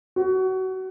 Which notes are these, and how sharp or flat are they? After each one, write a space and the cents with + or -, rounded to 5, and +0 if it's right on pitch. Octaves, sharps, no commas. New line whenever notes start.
F#4 +25